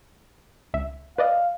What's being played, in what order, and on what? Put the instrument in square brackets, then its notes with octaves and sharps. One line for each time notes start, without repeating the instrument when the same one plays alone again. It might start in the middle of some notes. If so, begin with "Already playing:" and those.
[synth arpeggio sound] C#2 E5
[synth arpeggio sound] B4 D5 D#5 [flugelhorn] F5